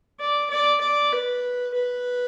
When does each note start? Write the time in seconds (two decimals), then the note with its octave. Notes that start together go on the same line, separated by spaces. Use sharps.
0.20 D5
0.50 D5
0.81 D5
1.12 B4
1.74 B4